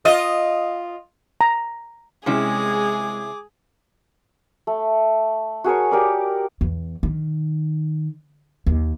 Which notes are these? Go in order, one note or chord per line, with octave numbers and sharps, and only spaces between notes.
F4 D#5
A#5
C3 G#3 C#4 E4 G#4 D6
A3
F#4 G#4 A#4 C#5
G4 A#4 D5
E2
D#3
D#2